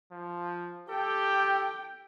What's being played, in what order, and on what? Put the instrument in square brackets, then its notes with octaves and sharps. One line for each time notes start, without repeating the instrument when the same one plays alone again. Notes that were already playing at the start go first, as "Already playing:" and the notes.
[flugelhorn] F3
[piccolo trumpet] G4 [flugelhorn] A4 [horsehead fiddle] G5